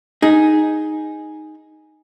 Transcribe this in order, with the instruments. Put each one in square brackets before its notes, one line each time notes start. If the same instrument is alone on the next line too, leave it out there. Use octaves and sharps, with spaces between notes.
[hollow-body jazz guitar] D#4 G#4